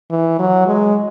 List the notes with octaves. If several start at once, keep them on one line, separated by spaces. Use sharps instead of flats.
E3
F#3
G#3